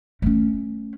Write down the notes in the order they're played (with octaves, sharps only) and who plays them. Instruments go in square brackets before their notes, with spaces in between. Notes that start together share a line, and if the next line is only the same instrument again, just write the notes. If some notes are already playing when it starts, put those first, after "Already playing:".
[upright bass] A3 C#4